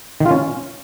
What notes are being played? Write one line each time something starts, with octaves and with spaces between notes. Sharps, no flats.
D#3
F4
C#4